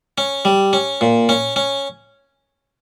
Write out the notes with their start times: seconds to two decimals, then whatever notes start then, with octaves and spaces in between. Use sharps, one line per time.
0.18 C#4
0.45 G3
0.73 C#4
1.01 A#2
1.29 C#4
1.56 C#4